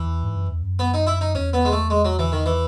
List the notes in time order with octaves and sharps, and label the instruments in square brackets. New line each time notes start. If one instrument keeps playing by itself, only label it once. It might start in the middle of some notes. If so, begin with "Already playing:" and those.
Already playing: [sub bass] E2 [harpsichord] E3
[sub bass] G#2
F#2
E2
F#2
[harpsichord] B3
D#4
E4
D#4
[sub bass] E2 [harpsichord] C#4
[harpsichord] B3
G#3
A3
G#3
F#3
E3
D#3
E3